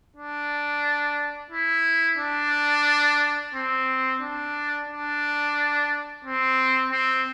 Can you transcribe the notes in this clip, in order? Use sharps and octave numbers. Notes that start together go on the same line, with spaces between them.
D4
E4
D4
C4
D4
D4
C4
C4